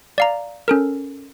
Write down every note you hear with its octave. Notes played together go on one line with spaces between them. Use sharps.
D5 F5 A#5
C#4 A4 A#4